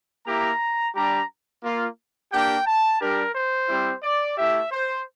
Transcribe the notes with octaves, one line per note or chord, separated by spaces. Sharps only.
A#3 E4 G4 A#5
G3 D4 G4 A#5
A#3 F4
A#3 D4 G4 G5
A5
G3 D4 G4 A#4
C5
G3 C4 E4 G4
D5
A3 E4 G4 E5
C5